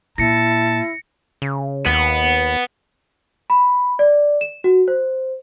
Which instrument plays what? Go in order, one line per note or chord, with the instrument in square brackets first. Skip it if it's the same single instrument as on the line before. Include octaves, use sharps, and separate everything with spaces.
[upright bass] A#2 [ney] E4 [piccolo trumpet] A5 [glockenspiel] A#6 C#7
[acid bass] C#3
[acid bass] D#2 [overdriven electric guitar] B3
[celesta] B5
D5
E7
F#4
C5